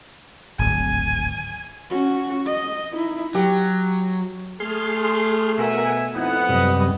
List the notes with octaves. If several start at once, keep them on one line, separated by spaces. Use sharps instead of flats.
D1 G#1 G#5
C#4 F#4
D#5
D#4 E4
F#3 G4
A3 G#4 C6 F6
B2 A#4 E5 F#5 G#5
F2 B3 D#4 E4 F#5
F#2 C3 G3 B4 D#5